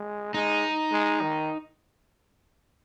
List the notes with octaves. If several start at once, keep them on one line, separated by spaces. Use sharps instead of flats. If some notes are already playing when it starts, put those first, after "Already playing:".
Already playing: G#3
G#3 D#4
G#3
D#3